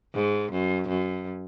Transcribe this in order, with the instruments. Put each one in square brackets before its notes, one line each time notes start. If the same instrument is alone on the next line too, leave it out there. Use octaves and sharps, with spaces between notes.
[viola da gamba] G#2
F#2
F#2